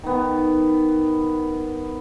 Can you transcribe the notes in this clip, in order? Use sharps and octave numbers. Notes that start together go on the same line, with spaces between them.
D#3 B3